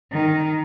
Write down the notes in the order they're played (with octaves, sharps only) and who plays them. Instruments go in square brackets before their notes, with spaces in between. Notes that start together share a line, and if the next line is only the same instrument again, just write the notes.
[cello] D#3